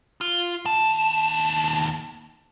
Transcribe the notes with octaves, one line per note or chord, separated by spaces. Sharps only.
F4
D#2 A5